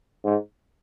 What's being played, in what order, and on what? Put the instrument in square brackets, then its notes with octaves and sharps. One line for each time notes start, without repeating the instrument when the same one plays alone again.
[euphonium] G#2